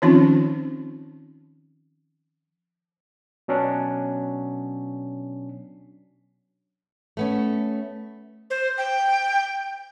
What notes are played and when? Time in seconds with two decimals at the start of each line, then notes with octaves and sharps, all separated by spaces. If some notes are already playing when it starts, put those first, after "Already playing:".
0.02 D#3 F3 C4 C#4 D#4 F4
3.48 B2 F#3 C#4 D4
7.17 A3 B3 C#4
8.50 C5
8.78 G5